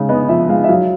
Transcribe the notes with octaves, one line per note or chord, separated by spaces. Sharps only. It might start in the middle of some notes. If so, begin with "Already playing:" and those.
Already playing: C#3 G#3
B3 D#5
F3 E5
G#3 F5
E5
F#3 F5